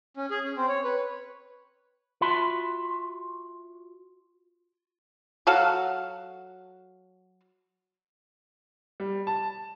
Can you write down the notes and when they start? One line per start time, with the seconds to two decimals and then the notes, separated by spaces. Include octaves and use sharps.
0.17 C#4
0.31 G#4
0.44 C#4
0.57 C4
0.69 C#5
0.84 B4
2.21 F4 F#4 E5 A5 B5 C6
5.47 F#3 F#4 A4 F5
9.00 G3
9.27 A5